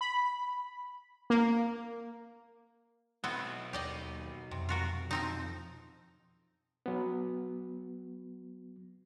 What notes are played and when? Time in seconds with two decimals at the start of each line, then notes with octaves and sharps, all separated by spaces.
0.01 B5
1.30 A#3
3.24 B1 B3 C4 E4
3.73 D#2 G4 D5 D#5
4.51 F2 C3
4.69 F4 F#4 A#4
5.11 F3 C4 D#4
6.86 F#3 B3